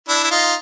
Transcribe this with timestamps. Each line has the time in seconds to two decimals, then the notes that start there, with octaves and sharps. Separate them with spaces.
0.09 D4 E4
0.23 E4
0.31 D#4 F4